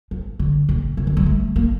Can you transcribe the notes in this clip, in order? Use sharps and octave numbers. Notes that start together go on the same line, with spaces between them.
F3
D3
A#2
C3
D3
G3
A3
A#3